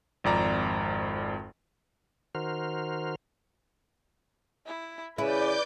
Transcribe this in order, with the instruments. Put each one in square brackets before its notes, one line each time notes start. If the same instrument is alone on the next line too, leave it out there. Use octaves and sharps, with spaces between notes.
[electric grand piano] G#1 F2 D5 A#5
[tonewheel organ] D#3 F#4 A#4 C5 F6
[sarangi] E4
[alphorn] C#3 [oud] E4 [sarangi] B4 [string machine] D5 D6 G6